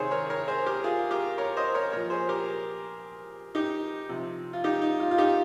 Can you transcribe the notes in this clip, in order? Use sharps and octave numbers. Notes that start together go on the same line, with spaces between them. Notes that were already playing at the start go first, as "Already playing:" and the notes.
Already playing: C3 D#3 G#4 C5 C#5
A#4 C#5
A#4 C#5
G#4 C5
G4 A#4
F4 G#4
G4 A#4
A#4 C#5
C5 D#5
A#4 C#5
A#2 F3 A#4 C#5
G#4 C5
G4 A#4
D#4 G4
C3 F3
F4
D#4 G4
D#4
F4
F4
D#4 G4